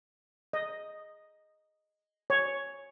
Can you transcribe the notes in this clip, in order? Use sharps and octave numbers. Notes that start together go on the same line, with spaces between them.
D#5
C#5